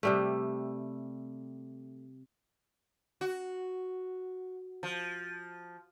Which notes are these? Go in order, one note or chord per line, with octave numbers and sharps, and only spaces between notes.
C3 G3 A3
F#4
F3